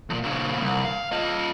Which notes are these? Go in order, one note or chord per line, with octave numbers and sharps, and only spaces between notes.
F2 A#2
A#2 C#3
C2
F5
F4 D#5